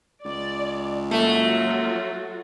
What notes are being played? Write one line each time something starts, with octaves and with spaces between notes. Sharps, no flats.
C#2 D5
F#3 A3 A#3 F4 F#4 A4